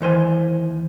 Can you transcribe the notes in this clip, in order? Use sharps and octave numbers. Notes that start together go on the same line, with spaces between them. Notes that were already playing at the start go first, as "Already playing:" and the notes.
D#2 E3 C5 G#5